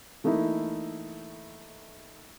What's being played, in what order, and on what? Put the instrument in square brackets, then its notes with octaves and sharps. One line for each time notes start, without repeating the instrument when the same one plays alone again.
[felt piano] E3 A3 A#3 D#4 E4